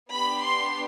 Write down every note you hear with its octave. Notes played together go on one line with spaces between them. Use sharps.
B3 D4 G4 B5
C6